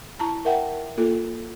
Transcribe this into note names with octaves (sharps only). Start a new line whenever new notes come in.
E4 A5 A#5
A#4 E5 F#5 G5
A#3 F4 A4